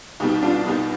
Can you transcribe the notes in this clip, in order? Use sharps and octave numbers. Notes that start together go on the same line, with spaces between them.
C2 B2 G3 D#4
D4 F4
C2 B2 G3 D#4